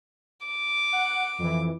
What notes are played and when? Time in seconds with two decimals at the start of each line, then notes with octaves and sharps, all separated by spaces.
0.46 D6
0.92 F#5
1.39 F2 E3